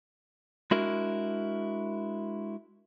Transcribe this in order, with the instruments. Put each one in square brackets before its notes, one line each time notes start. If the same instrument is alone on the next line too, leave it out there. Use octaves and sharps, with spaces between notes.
[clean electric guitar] G#3 D4 E4 F#4 A#4